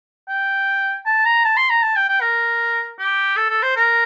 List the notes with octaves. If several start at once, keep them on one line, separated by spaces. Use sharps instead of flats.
G5
A5
A#5
A5
C6
A#5
A5
G5
G5
A#4
G4
A4
A4
C5
A#4